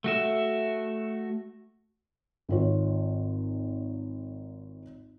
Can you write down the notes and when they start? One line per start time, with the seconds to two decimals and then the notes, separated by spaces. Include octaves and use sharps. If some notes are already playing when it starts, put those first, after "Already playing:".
0.04 A3 F#4 E5
2.49 G#1 F4 C#5